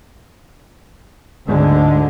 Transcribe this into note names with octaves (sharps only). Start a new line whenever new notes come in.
D2 G#2 D3 G#3